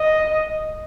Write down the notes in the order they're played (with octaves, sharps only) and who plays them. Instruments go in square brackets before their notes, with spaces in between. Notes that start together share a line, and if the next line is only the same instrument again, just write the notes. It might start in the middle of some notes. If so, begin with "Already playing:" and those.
Already playing: [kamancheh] D#5